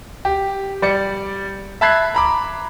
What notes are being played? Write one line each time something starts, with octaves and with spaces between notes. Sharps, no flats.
G4
G3 D5 C#7
E5 A5 B5 F#6 G#6 C7
A#5 B5 D6